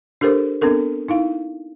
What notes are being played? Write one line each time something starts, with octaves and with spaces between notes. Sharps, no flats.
D4 G4 A4 A#4 C5
B3 C4 D4 A4 A#4
D#4 E4 F5